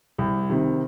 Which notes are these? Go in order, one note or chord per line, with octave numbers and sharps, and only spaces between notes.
C2
C3 D#3